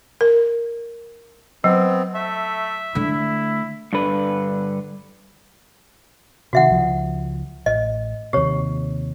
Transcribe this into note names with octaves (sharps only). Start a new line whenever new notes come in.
A#4
F#3 B3 C4
A3 E5
D3 A3 E4
G2 D3 B4
C3 D#3 F#4 E5 F#5
C#2 F3
A1 D#5
D#2 C3 G4 C#5